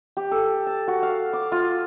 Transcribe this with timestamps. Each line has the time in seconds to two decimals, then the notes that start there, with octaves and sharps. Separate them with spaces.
0.17 G4
0.31 A4
0.67 A5
0.88 F#4
1.03 F5
1.33 D6
1.52 F4